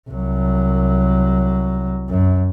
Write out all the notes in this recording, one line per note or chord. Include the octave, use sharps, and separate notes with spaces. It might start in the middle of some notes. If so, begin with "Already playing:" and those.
C2 F#3
F#2